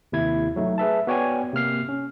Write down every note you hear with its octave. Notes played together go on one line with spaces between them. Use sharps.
D#2 C3 E4 G#6
F#3 A3 D#4
G#4 B4 E5 A5
B3 F#4 C#5 D5 G5 G#5
C3 A#3 F6 C7
C#4